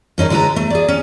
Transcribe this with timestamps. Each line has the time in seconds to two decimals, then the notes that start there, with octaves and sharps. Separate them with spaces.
0.18 G2 C#4 D#4 A#4
0.30 D3 G#3 F#4 A4 B4 A#5
0.56 A3
0.70 G#4 D5
0.88 C#4